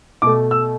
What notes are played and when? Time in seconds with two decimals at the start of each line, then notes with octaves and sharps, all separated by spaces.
0.22 B2 A3 D6
0.51 E6